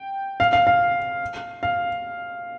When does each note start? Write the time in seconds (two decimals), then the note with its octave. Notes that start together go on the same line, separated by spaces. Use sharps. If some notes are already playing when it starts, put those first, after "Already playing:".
Already playing: G5
0.40 F5
0.53 F5
0.67 F5
1.63 F5